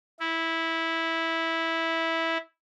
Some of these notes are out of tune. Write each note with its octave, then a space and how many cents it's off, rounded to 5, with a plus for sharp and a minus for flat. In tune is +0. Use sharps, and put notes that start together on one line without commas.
E4 -10